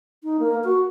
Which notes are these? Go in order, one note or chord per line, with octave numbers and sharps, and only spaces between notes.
D#4
A#3
F#4